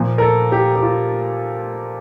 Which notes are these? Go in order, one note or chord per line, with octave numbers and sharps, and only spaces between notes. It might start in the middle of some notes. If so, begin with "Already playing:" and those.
Already playing: A#2 F3
A#4
A4
G4
G4
F4